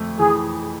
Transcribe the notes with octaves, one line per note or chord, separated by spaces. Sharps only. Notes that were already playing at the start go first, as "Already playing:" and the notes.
Already playing: F2 A3
E3 G#4